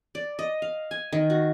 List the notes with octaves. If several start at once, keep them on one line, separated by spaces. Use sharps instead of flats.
D5
D#5
F5
G#5
D#3
F#4